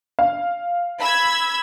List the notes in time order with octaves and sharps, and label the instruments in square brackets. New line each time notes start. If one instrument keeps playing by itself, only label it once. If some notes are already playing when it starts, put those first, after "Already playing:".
[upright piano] F5
[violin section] B5 E6 G#6